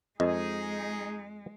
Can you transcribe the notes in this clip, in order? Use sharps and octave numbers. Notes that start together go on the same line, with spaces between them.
F2 G#3 D#4 G#4 D#5